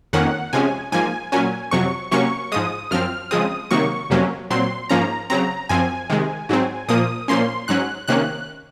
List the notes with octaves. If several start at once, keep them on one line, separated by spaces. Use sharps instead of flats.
F2 D#3 A#3 C#4 F#5
C3 F3 G#3 C#4 G#5
G#2 F3 A#3 G#5
A#2 F#3 C#4 G#5
F2 C3 F#3 C#6
C3 F#3 A#3 C#4 C#6
G#2 F3 G#3 D#6
F#2 F3 C4 F6
C#3 F3 G#3 C4 D#6
C3 D#3 F#3 A#3 C#6
F2 C3 F#3 A#3 C#4
A#2 F#3 C4 C6
G#2 F3 A#3 C#4 A#5
C#3 F#3 C4 A#5
F#2 F3 C4 G#5
C3 D#3 G#3
G#2 F#3 C4
A#2 F3 A#3 D#6
A#2 F3 A#3 C#4 C6
G#2 F#3 C#4 F#6
C3 D#3 A#3 C#4 F#6